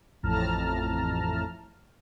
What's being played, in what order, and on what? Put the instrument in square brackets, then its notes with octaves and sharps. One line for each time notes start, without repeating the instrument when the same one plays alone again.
[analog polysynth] A1 F2 A2 A5 A#5 F6